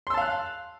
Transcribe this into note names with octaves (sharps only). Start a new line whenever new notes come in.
F5 A5 C6 E6 F#6